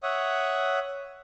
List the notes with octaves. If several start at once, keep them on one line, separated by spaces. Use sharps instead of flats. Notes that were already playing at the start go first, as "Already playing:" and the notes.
C#5 E5 F#5 D#6